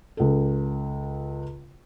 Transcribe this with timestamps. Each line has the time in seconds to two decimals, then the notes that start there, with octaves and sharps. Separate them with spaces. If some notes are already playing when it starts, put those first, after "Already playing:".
0.17 C#2 A4